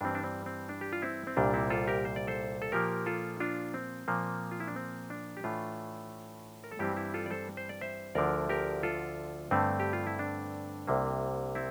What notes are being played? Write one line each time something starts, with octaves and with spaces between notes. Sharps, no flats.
G2 E3 G3 C4 D4
D4
C4
C4
D4
G4
F4
C4 E4
C4
C2 A#2 G3 D4
C4 E4
F4 A4
G4 A#4
C5
D5
A4 C5
A4
A#2 F3 A#3 G4 A#4
F4 A4
D4 F4
C4
A#2 F3 A#3
F4
E4
D4
C4
D4
G4
A2 E3 A3 D4 F4
A#4
A4
G2 E3 G3 C4 E4 G4
E4 G4
F4 A4
D5
A4 C5
C5
D5
C5 E5
D2 D3 F3 A#4 D5
G4 A#4
F4 A4
G2 D3 A3 C4
G4
F4
E4
D4
C2 C3 G3 A#3
C4 E4